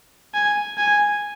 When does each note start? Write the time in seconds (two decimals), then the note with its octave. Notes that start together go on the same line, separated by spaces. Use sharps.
0.34 G#5
0.77 G#5